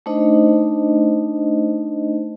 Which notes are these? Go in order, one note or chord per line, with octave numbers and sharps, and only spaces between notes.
A3 D4 D#4 C5 D#5